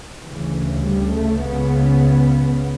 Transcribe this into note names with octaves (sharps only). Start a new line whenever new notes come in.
D2 C#3 E3
G3
A3
C#2 C#3 B3